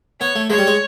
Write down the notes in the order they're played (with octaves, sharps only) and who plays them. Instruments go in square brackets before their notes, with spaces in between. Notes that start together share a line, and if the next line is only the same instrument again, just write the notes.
[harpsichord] B3 [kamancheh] C#5
[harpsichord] A3
[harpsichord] G#3 [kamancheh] C#5
[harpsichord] G3
G#3